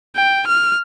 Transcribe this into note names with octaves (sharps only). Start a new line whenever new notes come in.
G5
F6